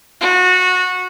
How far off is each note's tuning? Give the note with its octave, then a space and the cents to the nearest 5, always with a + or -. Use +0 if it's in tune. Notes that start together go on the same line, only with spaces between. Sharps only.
F#4 -20